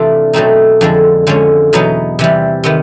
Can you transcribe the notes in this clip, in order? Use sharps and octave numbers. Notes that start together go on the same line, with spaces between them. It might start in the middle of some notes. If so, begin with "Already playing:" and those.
Already playing: C3 E3 A3 D4 F4
B2 F#3 A3 C4 D#4
F2 D3 F3 G#3
D3 F3 G#3 C#4
E2 B2 F#3 B3 D#4
C3 E3 G3
C3 D#3 B3